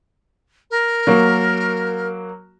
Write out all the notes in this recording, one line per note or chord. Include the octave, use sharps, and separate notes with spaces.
A#4
F#3 A#3 F#4